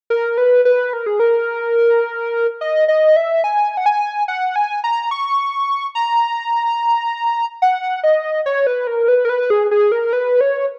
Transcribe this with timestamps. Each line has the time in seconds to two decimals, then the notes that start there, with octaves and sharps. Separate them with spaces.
0.10 A#4
0.38 B4
0.65 B4
0.93 A#4
1.06 G#4
1.20 A#4
2.61 D#5
2.88 D#5
3.16 E5
3.44 G#5
3.77 F#5
3.86 G#5
4.28 F#5
4.56 G#5
4.84 A#5
5.11 C#6
5.95 A#5
7.62 F#5
8.03 D#5
8.46 C#5
8.67 B4
8.87 A#4
9.08 B4
9.25 A#4
9.29 B4
9.50 G#4
9.71 G#4
9.92 A#4
10.13 B4
10.41 C#5